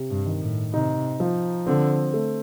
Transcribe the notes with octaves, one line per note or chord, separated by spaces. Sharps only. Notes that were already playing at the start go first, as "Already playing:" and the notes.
Already playing: C3
G2
D#3
A2
C3 D#4
F3
D3 C4
A3